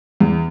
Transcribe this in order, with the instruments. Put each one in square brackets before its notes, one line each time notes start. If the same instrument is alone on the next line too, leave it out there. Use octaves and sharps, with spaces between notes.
[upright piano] E2